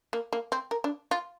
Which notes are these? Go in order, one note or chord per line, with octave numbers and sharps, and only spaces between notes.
A#3
A#3
C4
A#4
D4
F4